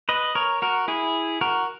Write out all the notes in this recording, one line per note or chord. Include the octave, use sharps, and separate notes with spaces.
B4 D#5
A#4 C#5
F#4 A#4
E4 G#4
F#4 A#4